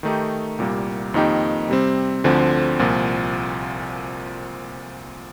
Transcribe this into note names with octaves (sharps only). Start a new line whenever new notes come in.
D#3 A3 D#4 G4
C2 A#2 G3 A#3
F2 D#3 A#3 D#4 G4
C3 G3 C4
D2 D3 F3 C4
C2 A#2 F3